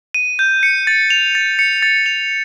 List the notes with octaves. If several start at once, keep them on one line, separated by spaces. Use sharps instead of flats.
D#7
G6
C#7
A6
F7
A6
C#7
A6
F7